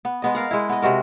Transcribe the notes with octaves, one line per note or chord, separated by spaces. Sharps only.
B3
G#3 B3 D#5
A#4 F5 F#5
G#3 E4
B3 D#5
C3 G#3 F#4 A#4